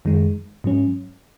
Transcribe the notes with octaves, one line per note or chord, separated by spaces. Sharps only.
F#2 D#3 G#3
G#2 F#3 C#4